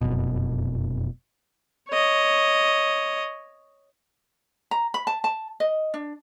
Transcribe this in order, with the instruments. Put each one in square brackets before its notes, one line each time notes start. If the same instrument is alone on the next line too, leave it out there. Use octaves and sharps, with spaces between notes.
[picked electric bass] F1 F#2 B2
[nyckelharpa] C#5 D#5
[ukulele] A#5
B5
A5
A5
D#5
D4